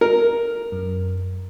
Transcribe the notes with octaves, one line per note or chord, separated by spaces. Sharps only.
A#4
F#2